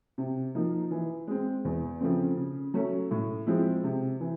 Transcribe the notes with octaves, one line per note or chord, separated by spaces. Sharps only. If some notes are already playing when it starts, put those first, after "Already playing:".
C3
F3 A#3 D#4
E3
G#3 C4
E2
C#3 F3 A3 C4
C#3
F#3 A3 C#4
A2
F3 G#3 C4 E4
C3
E3